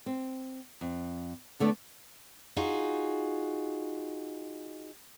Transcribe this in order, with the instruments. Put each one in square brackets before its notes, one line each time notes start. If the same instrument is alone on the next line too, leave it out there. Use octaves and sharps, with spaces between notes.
[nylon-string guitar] C4
F2
E2 D3 A3 B3 C4 D4
[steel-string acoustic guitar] D#4 F4 F#4 G#4